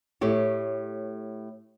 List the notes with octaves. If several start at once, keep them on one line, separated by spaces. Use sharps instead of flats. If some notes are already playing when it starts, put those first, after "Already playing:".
A2 G4 C#5